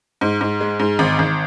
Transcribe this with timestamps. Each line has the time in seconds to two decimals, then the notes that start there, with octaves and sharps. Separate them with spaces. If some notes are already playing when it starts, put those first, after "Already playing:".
0.21 G#2
0.41 G#2
0.61 G#3
0.79 G#2
0.99 G#1
1.19 G#1